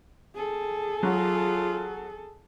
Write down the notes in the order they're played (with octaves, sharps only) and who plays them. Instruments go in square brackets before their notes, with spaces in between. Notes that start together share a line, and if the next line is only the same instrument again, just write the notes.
[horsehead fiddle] G#4 A4
[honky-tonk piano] F#3 F#4 [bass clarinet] F4